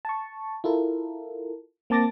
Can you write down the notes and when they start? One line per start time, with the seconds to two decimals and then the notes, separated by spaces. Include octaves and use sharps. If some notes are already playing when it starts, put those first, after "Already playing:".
0.05 A5 C#6
0.64 E4 F4 A4 A#4
1.90 A#3 C4 A5 D6 A6 A#6